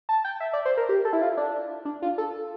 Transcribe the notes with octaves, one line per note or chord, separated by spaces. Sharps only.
A5
G5
E5
D5
C5
A#4
G4
A4
E4
F4
D4
D4
F4
A4